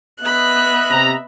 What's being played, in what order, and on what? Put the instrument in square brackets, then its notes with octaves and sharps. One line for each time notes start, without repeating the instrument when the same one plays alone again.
[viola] B3 B5 [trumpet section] B4 D#5 E5 [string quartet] F#6
[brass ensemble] C3 A#5